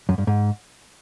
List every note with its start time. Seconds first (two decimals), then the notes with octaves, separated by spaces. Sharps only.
0.09 F#2
0.18 G2
0.27 G#2